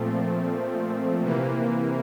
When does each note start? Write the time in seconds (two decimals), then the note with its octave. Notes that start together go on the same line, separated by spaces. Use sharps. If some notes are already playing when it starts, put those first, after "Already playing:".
Already playing: A#2 F3 A3 C4
1.20 C3 E3 A#3